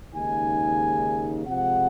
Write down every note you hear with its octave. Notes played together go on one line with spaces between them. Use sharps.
D#2 C#3 G#3 D#4 G#5
C3 F3 G#3 F#5